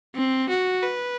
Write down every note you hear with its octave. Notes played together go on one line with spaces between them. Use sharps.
C4
F#4
B4